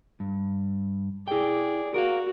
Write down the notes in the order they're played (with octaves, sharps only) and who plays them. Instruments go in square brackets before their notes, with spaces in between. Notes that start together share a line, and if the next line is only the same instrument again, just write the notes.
[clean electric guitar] G2
[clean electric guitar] E4 G5 [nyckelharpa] G#4 D5
[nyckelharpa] F#4 [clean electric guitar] A#4 F5